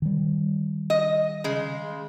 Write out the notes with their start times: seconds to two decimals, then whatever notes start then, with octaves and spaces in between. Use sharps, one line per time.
0.02 D#3 G3
0.90 D#5
1.44 C#3 G#3